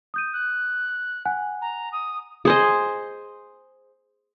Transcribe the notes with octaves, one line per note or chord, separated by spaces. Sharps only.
D#6 G6 D#7
F#6
F#5 G#5 F#6
A#5
D#6
G#4 C5 D#5